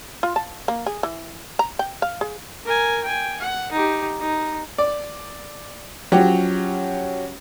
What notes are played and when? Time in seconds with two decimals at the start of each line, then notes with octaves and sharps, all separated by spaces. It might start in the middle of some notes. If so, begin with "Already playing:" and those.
0.23 F4
0.36 A5
0.68 A#3
0.86 G#4
1.03 E3
1.59 A#5
1.79 G5
2.02 F5
2.21 G#4
2.65 A#4 G#5
3.03 G5 G#5
3.40 F#5
3.72 D#4 G4
4.20 D#4
4.78 D5
6.12 F3 F#3 C#4 G4